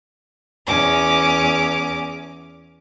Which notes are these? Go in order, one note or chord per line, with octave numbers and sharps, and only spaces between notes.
E2 C#4 D6